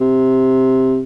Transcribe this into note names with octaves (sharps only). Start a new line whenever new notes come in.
C3